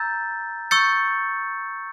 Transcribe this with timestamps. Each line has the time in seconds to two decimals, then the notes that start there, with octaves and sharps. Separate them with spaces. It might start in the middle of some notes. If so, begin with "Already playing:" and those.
Already playing: A#5 E6 G6 A6
0.71 C#6 E6 G6 A6 C#7